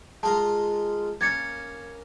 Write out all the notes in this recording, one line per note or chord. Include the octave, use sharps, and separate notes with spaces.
G#3 F4 A#4 A5
A#3 C#4 G#6 A6 C#7